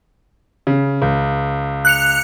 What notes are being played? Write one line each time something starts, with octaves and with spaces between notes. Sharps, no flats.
C#3
C#2
F#6 C#7 F7